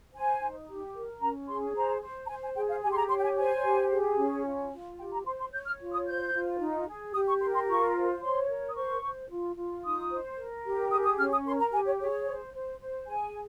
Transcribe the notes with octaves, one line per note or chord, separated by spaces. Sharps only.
C5 G#5
D#4
G4
A#4
C#4 A#5
G#4 C6
C5 A#5
C5
A#5
C5 G#5
G#5
G#4 G5
F5
G4 G#5
C6
A#5
C#5 C6
G5
G#5
C5 G#5
G4
G#4
C#4
F4
F4
G4 G5
A#5
C5 C6
C6
C#5 G6
F6
F4
D#6
C5 G6
F4
D#4
G#4
G4 D#6
C#6
A#4 C6
C6
F4 C#6
C5
C#5 C6
A#4
D#6
C5 C#6
C5
F4
F4
D#4 D#6
C5
A#4
G4
G#4 D#6
D#6
C#4 F6
D#6
A#4 C6
A#5
G4 G#5
C#5
G#4 C#5
C5
C5
C5
G#4 G#5